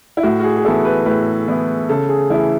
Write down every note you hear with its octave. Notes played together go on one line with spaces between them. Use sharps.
E4
A2 F#4
F#4
G#4
G#4
E3 B3 E4 A4
B4
A2 B4
E3 B3 E4
C#3 A4
G#4
E3 A3 E4